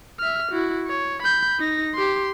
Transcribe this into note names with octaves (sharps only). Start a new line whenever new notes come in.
E5 F6
E4 F#4
C#5
B5 G6
D#4 A#6
G4 C6